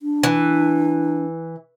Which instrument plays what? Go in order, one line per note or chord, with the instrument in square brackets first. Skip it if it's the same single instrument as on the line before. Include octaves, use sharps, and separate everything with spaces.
[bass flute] D4
[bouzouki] E3